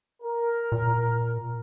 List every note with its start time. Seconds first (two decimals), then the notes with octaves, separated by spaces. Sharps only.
0.23 A#4
0.72 A#2